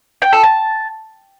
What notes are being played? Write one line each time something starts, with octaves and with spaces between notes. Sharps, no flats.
G5
A4
A5